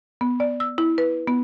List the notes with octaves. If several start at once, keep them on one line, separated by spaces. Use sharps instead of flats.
B3
D5
E6
E4
B4
B3